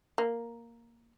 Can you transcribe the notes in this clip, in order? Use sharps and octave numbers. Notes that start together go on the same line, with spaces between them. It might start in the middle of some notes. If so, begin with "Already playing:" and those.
A#3